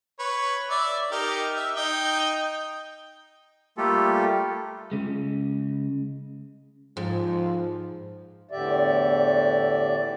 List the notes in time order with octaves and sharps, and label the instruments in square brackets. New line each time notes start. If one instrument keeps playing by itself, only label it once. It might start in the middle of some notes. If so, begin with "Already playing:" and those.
[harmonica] B4 C#5
D5 E5
D#4 G4 A#4
E5
D#4 G5 D#6
[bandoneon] G3 A3 A#3 F4 G4 A4
[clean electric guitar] C#3 G#3
[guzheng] G#2 [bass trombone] F3
[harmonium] E2 A2 D3 G4 D5 E5